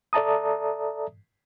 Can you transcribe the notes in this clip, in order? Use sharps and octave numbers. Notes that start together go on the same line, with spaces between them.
A4 D5 E5 A5 A#5 D#6